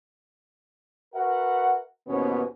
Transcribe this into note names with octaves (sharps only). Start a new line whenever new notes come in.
F#4 A#4 B4 E5 F#5
D#2 G#2 B2 E3 B3 C#4